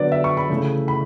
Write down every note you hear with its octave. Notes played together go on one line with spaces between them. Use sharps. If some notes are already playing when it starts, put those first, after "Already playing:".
Already playing: D3 F#3 B3 D5
E5
C#6
B5
C#3 E3 A3 E4
B5